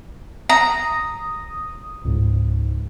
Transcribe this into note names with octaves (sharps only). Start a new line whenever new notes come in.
A#5 D#6
C#2 G#2